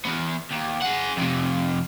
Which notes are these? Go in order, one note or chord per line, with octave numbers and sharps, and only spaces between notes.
E3 B3
D#2
G#4 F#5
F2 C3